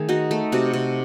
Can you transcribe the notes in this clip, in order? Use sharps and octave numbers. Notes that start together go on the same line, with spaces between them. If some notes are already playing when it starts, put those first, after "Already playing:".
Already playing: D#3 A3 G#4
D#4 F#4
A3
C3 F#4
C3